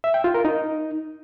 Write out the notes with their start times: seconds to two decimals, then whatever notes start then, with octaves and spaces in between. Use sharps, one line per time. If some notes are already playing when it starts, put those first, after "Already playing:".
0.04 E5
0.14 G5
0.24 F4
0.34 A#4
0.45 D#4